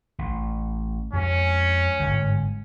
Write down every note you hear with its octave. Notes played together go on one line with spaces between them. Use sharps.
A1
F2 G#3 C#4
G1 G#2 G#3